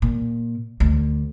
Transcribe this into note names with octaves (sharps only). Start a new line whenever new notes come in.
A#2
D2